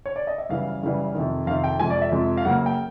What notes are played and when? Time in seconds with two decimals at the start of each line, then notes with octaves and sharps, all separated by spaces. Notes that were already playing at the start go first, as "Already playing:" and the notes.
0.06 C#5
0.16 D5
0.27 D#5
0.38 E5
0.49 F#2 C#3 E3 G3 F5
0.83 F#2 C#3 E3 G3
1.14 F2 C3 D#3
1.47 F2 C3 D#3 F5
1.64 G5
1.79 F2 C3 F3 G#3 G#5
1.90 D5
2.02 E5
2.12 F2 C3 F3 G#3
2.37 F5
2.44 F#2 C#3 F#3 A#3 F#5
2.66 G5